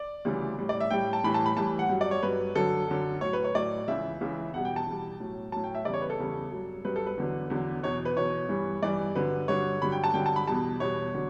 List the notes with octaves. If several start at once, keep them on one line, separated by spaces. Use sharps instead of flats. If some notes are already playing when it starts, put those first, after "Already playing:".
Already playing: D5
D2 C#3 E3 G3
A2 G3
D5
E5
A2 G3 G5
A5
A2 E3 G3 B5
A5
B5
A2 E3 G3 A5
F#5
G2 F#3
D5
C#5
G2 F#3 B4
F#2 D3 F#3 A4
F#2 D3 F#3
A2 F#3 C#5
B4
C#5
A2 F#3 D5
C#2 C#3 E3 E5
C#2 C#3 E3
E2 B2 G3 F#5
G5
A5
E2 B2 G3
A2 F#3
A2 F#3 A5
G5
E5
E2 C#3 G3 D5
C#5
B4
A4
E2 C#3 G3
G2 F#3
G2 F#3 B4
A4
B4
E2 D3 F#3
E2 D3 F#3
E2 B2 F#3 C#5
B4
E2 B2 F#3 C#5
G2 E3 G3
G2 E3 G3 D5
G2 D3 F#3 B4
G2 D3 F#3 C#5
G2 D3 F#3 B5
G5
A5
G2 D3 F#3 G5
A5
B5
E2 B2 G3 A5
E2 B2 G3 C#5
D3 F#3